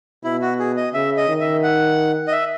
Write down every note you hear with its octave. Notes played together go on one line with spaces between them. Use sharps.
B2 E4
F#4
G#4
D#5
C#3 E5
D#5
D#3
E5
F#5
D#5
E5